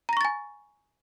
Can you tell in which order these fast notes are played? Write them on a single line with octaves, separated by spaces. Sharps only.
A#5 A#6 C#6 A6 G#5